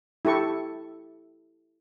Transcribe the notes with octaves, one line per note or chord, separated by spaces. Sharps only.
E4 G4 A4 C#6